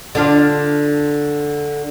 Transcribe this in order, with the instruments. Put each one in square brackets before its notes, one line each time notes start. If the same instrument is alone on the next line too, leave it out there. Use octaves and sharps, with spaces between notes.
[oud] D3 D4 F4